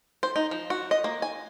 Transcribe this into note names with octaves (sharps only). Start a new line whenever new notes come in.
C5
D#4
F3
F#4
D#5
A#3
G#5